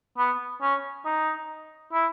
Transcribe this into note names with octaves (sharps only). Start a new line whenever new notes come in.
B3
C#4
D#4
E4